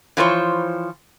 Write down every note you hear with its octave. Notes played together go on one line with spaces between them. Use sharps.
E3 F3 C5 C#5